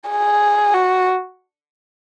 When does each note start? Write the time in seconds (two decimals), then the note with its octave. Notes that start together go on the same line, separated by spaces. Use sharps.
0.09 G#4
0.74 F#4